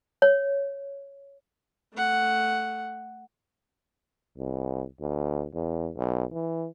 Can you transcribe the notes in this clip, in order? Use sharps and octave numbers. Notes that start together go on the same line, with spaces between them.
C#5
A3 F#5
C2
D2
E2
B1
E3